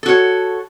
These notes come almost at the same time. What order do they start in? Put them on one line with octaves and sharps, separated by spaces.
A4 F#4 C#5